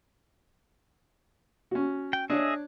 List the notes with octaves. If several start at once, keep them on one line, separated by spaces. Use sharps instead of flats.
C#4 F#4
G5
D4 G#4 C#5 D#5 E5